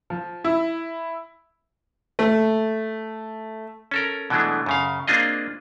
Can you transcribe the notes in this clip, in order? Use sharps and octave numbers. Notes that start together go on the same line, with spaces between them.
F3
E4
A3
C#4 A4 A#4
B2 E3 F#3 G#3 A3 D4
F#2 C#3 F5
A#3 C4 D4 F4 G#4 D#5